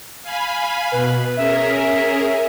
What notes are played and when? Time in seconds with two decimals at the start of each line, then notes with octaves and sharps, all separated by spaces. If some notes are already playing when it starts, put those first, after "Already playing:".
0.23 F5 G#5 B5
0.92 B2 B4
1.37 C#4 G#4 A#4 E5